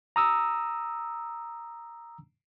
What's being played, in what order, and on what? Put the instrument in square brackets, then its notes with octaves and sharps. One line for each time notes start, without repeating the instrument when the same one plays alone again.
[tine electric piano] A#5 D#6 E6